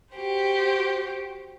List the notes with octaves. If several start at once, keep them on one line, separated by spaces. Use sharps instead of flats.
F#4 G4 C5